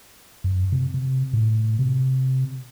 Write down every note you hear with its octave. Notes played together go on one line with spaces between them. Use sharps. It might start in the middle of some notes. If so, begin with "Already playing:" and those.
F#2
C3
C3
A2
C3